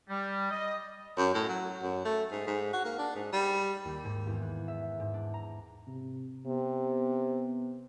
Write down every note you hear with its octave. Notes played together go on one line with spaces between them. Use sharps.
G3
D#5
F#2
A2
F#3
F#2
A3
G#2
G#2
F#4
A#3
D4
G#2
G3
D#2
G#2
E2
F#6
E5
G#2
D4
A#5
C3
C3 B3